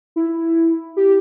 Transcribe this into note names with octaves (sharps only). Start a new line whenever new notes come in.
E4
G4